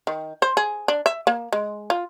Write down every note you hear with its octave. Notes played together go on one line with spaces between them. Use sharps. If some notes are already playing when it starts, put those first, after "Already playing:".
D#3
C5
G#4
D4
E5
A#3
G#3
F4